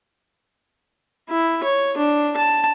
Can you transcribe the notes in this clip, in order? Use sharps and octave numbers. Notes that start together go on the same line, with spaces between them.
E4
C#5
D4
A5